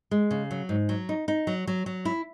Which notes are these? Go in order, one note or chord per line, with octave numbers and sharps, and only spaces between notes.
G#3
C#3
F#3
G#2
F#3
D#4
D#4
F#3
F#3
F#3
E4